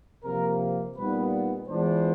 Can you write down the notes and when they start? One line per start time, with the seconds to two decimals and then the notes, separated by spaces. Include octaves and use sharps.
0.24 C3 F3 A#3 A#4
0.97 A#2 G3 B3 D#4 B4
1.68 E3 G#3 B3 D4 F4 C5